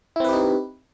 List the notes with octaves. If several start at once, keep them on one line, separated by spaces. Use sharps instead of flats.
C4 D#4 E4 G4 B4